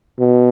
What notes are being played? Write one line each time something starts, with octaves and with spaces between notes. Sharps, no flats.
B2